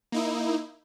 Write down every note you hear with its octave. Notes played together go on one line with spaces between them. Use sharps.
A#3 D#4 E4